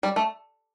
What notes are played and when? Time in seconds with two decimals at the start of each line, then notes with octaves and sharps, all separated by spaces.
0.03 G3
0.16 A3